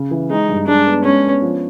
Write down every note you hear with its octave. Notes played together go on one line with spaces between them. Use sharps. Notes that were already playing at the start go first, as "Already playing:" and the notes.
Already playing: C#3
E3
G#3 D#4
G2
G#3 D4
B3
G#3 C#4
B3
F3